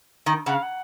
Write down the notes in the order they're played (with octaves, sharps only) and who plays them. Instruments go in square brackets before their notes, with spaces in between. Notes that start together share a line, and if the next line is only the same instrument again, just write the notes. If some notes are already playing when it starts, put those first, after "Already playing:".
[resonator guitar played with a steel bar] D#3
[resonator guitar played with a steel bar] C#3 [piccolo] F#5
[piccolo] F5
F#5